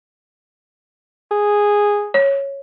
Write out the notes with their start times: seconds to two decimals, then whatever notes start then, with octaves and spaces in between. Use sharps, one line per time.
1.31 G#4
2.14 C#5